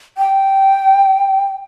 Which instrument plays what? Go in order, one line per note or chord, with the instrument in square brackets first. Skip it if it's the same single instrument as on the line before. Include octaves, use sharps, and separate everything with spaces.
[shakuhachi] G5